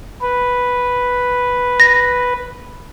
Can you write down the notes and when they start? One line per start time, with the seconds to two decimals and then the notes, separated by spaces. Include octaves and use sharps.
0.21 B4
1.80 A#6